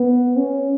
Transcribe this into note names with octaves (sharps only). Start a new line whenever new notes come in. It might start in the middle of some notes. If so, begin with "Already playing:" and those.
Already playing: B3
C#4